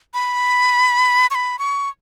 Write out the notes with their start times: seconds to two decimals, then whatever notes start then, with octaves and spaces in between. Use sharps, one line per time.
0.14 B5
1.31 C#6
1.35 B5
1.59 C#6